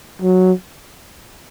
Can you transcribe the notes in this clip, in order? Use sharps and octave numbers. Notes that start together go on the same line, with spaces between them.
F#3